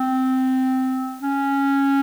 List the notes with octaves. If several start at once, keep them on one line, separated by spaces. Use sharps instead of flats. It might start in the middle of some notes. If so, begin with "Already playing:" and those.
Already playing: C4
C#4